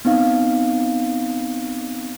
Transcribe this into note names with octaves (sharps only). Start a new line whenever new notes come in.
B3 C4 D#4 F5